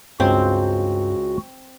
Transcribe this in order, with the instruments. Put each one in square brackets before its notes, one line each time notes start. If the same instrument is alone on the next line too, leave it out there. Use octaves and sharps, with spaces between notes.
[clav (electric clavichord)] C#2 C5 G5 [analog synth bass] G2 [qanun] C4 [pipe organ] F#4